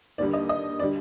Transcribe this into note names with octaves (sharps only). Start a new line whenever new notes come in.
D#2 D3 G3 D5
D#5
D#5
D3 G3 D5